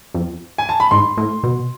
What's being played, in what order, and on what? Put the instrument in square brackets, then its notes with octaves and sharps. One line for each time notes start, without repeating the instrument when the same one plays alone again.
[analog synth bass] F2
[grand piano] G#5
A5
B5
[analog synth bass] G#2 [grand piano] C6
[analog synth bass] A2
B2